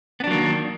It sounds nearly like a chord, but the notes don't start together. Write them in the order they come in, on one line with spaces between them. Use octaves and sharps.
B3 D4 F#3 A#3 D#3